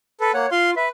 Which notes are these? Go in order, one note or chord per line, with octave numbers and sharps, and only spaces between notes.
A4 B4
A#3 C#5 F#5
F4 F5 C6
B4 E5